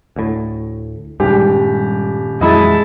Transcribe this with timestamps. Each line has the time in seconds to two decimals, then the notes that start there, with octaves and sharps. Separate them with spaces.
0.16 D2 A2
1.20 D#1 G2 G#3 G4
2.41 F2 E3 F#3 G#3 E4 D#5 A5